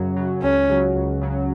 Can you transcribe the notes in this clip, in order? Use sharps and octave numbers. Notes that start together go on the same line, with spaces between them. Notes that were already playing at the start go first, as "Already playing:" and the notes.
Already playing: F#2 C#3 F#3
C#3 F#3
C#2 C#4
C#3 F#3
C#2
C#3 F#3